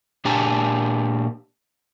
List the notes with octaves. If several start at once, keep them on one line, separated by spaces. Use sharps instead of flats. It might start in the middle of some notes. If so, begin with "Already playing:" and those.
A#2 D4 G4 G#5 A5